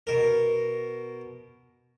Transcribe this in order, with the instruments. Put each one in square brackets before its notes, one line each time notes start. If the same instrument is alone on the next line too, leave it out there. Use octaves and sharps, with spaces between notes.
[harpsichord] B2 A#4